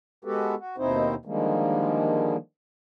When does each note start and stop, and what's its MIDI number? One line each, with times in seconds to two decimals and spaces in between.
0.25 0.55 56
0.25 0.55 59
0.25 0.55 66
0.25 0.55 67
0.25 0.55 69
0.25 0.55 71
0.59 0.76 66
0.78 1.15 39
0.78 1.15 47
0.78 1.15 60
0.78 1.15 63
0.78 1.15 64
0.78 1.15 72
1.25 2.37 50
1.25 2.37 51
1.25 2.37 53
1.25 2.37 55
1.25 2.37 56
1.25 2.37 58